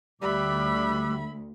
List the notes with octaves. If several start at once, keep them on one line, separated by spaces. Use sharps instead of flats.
D2 G3 E5 B5 D6 E6 F#6